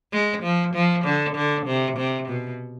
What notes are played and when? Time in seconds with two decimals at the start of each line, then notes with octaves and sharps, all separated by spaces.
0.12 G#3
0.43 F3
0.74 F3
1.05 D3
1.36 D3
1.66 C3
1.97 C3
2.29 B2